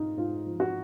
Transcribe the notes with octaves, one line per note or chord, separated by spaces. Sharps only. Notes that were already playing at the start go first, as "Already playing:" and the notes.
Already playing: G#2 G#3 D#4 F4
G#2 F4
F3
F#4